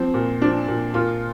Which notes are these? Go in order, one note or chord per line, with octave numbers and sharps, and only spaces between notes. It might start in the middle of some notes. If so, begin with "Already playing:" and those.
Already playing: F3 C4
A#2
F3 D4
A#2
A#2 F4